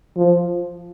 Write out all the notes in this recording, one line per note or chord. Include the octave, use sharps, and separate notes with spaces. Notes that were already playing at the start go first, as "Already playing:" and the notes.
F3